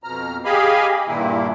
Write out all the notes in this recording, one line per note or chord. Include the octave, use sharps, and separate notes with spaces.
F2 B2 A#5 F6
G4 G#4 D#5 F5 G#5 B5
G2 A#2 D#3 A#3 E4